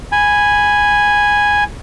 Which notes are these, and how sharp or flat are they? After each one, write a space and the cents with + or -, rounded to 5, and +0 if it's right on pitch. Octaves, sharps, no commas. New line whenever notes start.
G#5 -5 B5 +0